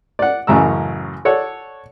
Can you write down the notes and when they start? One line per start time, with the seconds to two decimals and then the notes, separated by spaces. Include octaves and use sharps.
0.19 D5 F#5
0.47 A1 F#2 C#3 A#5 E6
1.25 A4 C#5 D5 F#5